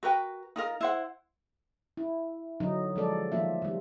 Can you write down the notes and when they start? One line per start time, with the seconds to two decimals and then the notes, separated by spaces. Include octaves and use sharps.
0.03 F#4 A#4 B4 G5
0.56 D#4 F4 A#4
0.81 E4 C5 F#5
1.97 E4
2.60 D3 F#3 D#4
2.96 F3 G#3 A4 D5
3.32 D#3 F3 A3 A#3 F4 E5
3.62 D#3 G3